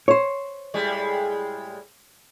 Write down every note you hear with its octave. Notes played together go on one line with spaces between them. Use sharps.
C5 C#5
A2 G3 G#3